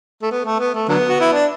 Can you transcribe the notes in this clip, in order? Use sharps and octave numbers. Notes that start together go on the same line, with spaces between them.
A3
B3
A3
B3
A3
D3 F#3 B3
F#4
E4
D4